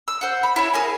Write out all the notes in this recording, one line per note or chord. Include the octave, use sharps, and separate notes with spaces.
E6
C5 F#5
B5
E4 C#5 A5
G#4 A#4 G#5